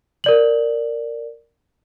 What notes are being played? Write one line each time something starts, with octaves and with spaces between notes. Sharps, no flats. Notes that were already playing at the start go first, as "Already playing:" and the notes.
A#4 D5 F#7